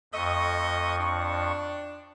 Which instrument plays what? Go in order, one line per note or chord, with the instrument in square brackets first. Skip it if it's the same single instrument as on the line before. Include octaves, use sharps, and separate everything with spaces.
[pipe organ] F2 C#6 [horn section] A3 A4 D#5
[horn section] D4